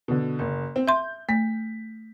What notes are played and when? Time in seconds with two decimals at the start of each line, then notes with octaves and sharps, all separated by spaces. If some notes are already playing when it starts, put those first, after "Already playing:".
0.08 B2 D3
0.39 F#1
0.76 C4
0.88 E5 C6 G6
1.29 A3 B6